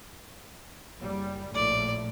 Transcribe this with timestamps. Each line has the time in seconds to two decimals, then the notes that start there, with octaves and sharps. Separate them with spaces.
1.02 F#1 G3
1.54 A#1 A2 D5